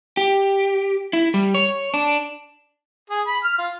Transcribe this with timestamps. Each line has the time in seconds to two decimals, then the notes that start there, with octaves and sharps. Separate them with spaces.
0.17 G4
1.13 E4
1.34 G3
1.55 C#5
1.94 D4
3.10 G#4
3.27 B5
3.44 F6
3.58 F4